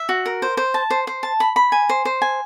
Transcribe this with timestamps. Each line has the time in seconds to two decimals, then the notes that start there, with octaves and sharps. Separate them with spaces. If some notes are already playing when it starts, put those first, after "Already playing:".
Already playing: E5
0.09 F#4
0.26 A#4
0.42 C5
0.57 C5
0.74 A5
0.90 C5
1.07 C5
1.23 A5
1.40 B5
1.56 B5
1.72 G#5
1.89 C5
2.05 C5
2.22 G#5